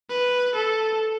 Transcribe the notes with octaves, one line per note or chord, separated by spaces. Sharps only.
B4
A4